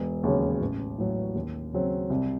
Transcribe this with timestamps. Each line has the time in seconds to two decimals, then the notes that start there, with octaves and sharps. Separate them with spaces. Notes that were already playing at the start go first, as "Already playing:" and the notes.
Already playing: E1
0.23 D#2 C#3 F#3 C#4
0.61 A1
0.98 A2 F#3
1.35 D#2
1.73 C#3 F#3 C4
2.10 C2